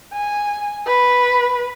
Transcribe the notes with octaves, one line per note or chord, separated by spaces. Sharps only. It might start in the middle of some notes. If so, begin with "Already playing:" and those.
G#5
B4